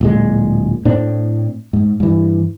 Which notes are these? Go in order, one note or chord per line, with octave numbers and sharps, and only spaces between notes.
D1 A#2 G#3
A2 C4 D4
G#2
G2 E3